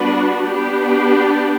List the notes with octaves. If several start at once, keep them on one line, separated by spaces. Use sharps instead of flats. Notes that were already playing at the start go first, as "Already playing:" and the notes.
Already playing: G3 B3 D4 F#4 B4
B3 D4 G4